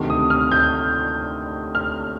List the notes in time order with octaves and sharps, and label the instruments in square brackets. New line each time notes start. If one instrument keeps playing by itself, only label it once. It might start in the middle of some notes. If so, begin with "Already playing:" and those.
Already playing: [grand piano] D2 C3 D#3
D#6
F6
G6
F6